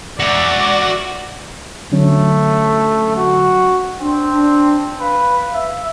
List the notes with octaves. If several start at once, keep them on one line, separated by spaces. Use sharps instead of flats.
F#4 D5 E5 F#5
D3 F#3 A3 C#4
F#4
C4 D4
D4
B4 F5
E5